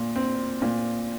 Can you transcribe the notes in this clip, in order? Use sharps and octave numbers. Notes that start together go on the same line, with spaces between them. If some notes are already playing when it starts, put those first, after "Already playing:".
Already playing: A#2
C4
A#2